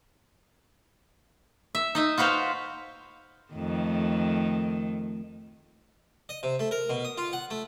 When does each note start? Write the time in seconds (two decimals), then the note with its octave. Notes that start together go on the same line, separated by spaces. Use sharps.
1.75 E5
1.95 D#4 D#5 E5
2.18 F4 F#4 B4 C5 F5
3.52 F2 D#3 A3
6.29 D#5
6.43 C3
6.59 A3
6.71 A#4
6.90 B2
7.05 D#6
7.18 F4
7.33 F#5
7.50 A3